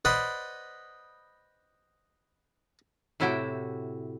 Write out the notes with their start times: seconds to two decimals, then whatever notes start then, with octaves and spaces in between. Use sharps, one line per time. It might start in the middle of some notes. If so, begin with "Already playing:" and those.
0.05 B4 C5 D5 D#5 F#5 B5
3.20 A2 C3 E4 F#4 E5 G5